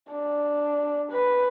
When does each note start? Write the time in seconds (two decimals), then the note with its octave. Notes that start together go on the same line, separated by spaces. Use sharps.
0.12 D4
1.11 B4